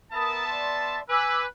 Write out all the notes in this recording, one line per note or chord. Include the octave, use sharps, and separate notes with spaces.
B3 A#4 E5 A5 B5 D#6
D5 C6
B4 G#5 D6 E6